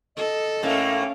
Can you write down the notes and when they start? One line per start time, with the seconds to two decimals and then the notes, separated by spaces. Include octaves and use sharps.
0.17 A4 D#5
0.63 A2 A3 A#3 C#4 F5